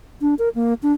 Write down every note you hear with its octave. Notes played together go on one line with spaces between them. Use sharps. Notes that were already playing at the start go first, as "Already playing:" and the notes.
D4
A#4
A#3
D4